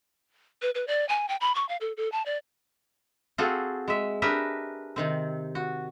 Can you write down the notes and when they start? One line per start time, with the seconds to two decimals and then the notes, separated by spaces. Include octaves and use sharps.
0.62 B4
0.75 B4
0.87 D5
1.09 G#5
1.29 G5
1.41 B5
1.55 C#6
1.69 F5
1.81 A4
1.97 A4
2.12 A5
2.26 D5
3.38 C4 F4 F#4 G#4 A4
3.88 G#3 E5
4.22 D4 G4 G#4 A#4 B4 E5
4.96 C3 D#3 C4
5.55 F#4